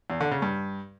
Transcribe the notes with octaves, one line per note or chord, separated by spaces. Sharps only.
E2
D3
C#3
G2